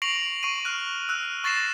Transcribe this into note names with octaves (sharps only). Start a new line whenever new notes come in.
C#6 A#6 C7 D7 F7 F#7
C#6 C7 D#7
F6 F#6
E6 F#6
C#6 A6 A#6 C7 E7